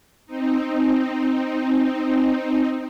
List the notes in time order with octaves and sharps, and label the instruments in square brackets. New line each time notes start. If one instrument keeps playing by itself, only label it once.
[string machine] C4 D#4